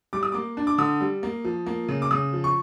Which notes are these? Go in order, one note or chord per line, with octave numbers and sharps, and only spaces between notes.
G3 D6
D#6
A#3 D6
D4
D6
D3 D#6
G3
A#3
F3
A#3
C#3
D6
C#3 D#6
F3
C#6